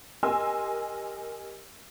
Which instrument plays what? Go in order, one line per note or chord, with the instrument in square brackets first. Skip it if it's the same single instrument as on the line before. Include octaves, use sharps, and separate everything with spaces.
[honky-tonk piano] G4 A#4 D#5 G#5 C6 E6